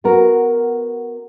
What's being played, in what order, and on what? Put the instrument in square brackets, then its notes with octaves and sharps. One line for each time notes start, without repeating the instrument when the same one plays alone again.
[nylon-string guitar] B3 F#4 A#4